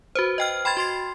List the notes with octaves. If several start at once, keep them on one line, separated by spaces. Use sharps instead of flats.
F#4 B4 C5
D#5 G5 F6
G5 B5 C6 G#6 A6
F#4 C6 C7